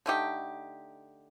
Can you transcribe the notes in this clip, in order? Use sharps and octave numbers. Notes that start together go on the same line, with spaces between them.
D3 A3 D#4 G4